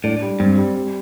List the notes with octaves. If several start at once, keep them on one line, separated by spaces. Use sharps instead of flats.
A2 D4
G3
G2 C4
G3
G3